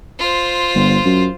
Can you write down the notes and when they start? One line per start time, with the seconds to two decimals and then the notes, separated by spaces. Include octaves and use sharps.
0.19 F4 C5
0.75 G1
1.05 F#2